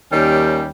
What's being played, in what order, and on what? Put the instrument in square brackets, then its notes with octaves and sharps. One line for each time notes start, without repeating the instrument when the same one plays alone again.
[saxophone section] D#2 D#3 G3 C#4 G4